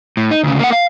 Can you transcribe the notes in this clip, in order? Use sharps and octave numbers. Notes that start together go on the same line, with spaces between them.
A2
D#4
D2 C#3
A#3 F#5
F5